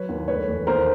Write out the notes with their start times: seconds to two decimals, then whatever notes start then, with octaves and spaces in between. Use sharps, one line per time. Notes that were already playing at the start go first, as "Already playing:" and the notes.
Already playing: F#3 B4 C#5
0.09 D#2
0.28 D2 B4 C#5
0.48 E1
0.67 D#2 A#4 C5